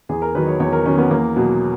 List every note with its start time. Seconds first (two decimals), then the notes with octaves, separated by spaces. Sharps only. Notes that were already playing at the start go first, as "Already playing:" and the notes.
0.09 E2 G#4
0.22 A#4
0.35 D#3 F#3 B4
0.47 C#5
0.60 E2 C#5
0.73 A#4
0.86 D#3 F#3 C#4
0.98 B3
1.11 E2 A#3
1.36 B2 F#3